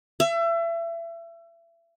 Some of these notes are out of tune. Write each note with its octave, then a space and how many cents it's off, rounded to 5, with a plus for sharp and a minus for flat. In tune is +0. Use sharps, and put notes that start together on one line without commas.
E5 +30